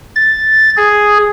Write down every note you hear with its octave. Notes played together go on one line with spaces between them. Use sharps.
A6
G#4